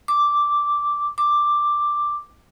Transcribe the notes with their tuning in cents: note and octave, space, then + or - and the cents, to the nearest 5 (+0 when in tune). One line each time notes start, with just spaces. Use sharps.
D6 -5
D6 +5